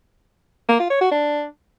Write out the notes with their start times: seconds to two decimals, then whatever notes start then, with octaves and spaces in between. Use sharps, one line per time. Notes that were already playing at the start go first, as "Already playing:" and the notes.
0.69 A#3
0.80 F4
0.90 C#5
1.01 F#4
1.12 D4